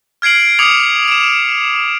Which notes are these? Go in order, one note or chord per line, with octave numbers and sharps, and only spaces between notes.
F6 G#6 C7 D7 F#7
D6 D#6 G#6 C#7 F7 F#7
D7 E7